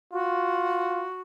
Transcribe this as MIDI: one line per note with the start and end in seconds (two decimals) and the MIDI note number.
0.13 1.07 65
0.13 1.21 66